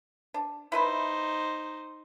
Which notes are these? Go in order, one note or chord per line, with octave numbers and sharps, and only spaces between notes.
D4
D#4 E4 B4 C5 E5